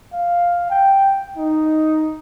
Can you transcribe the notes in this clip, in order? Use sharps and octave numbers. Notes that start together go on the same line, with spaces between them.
F5
G5
D#4